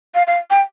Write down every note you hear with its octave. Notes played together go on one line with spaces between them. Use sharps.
F5
F5
G5